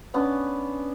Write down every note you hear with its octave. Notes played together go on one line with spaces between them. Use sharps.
B3 C#4 D4 B4